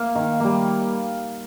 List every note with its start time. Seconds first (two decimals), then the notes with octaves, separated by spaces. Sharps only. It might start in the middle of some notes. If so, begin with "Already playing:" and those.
Already playing: A#3 F5
0.16 D#3
0.40 G3 A#3